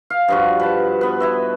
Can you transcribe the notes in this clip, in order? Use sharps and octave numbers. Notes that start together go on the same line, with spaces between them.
F5
G2 F3 F#4
B4 A5
B3 B4
E4 D#5 E5